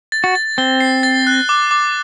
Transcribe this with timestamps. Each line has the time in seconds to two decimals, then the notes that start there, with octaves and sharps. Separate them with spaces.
0.12 A6
0.24 F#4
0.35 A6
0.58 C4 G7
0.80 C7
1.03 A6
1.27 F#6
1.49 D6
1.71 D6